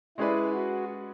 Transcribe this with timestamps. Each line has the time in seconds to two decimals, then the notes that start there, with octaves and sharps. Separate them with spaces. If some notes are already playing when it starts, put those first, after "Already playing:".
0.18 G#3 C#4 E4 G#4 B4 D5
0.53 F#4